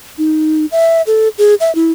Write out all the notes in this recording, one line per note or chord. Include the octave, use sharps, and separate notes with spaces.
D#4
E5
A4
G#4
E5
E4